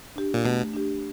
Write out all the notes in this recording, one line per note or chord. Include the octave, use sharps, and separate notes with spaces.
D4 G4
A#2
B2 A3
D4 G4